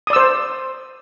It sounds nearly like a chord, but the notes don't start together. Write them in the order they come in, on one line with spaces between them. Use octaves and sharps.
D#6 D5 E6 C5